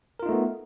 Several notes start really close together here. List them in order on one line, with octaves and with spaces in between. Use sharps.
A#4 F4 D#4 A3 B3